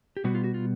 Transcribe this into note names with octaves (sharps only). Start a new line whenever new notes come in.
G4
B2 G3 B3 F#4
F4
F#4
F4